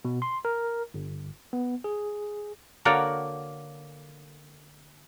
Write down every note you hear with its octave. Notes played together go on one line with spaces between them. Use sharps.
B2
C6
A#4
G1
B3
G#4
D3 A#3 F#4 A#4 C#5 D5